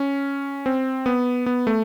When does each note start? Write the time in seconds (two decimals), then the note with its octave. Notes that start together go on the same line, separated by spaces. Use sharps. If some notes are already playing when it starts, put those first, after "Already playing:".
Already playing: C#4
0.66 C4
1.06 B3
1.46 B3
1.67 A3